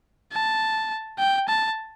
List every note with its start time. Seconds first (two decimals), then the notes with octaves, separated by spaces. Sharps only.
0.32 A5
1.19 G5
1.48 A5